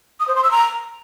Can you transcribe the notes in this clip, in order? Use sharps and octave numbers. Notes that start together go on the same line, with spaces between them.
D#6
C5
C6
E6
A#5